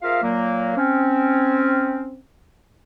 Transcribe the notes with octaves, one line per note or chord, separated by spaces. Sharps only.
C4 F4 G#4 A#4 E5 F5
A#2 F#3 A#3
C4 C#4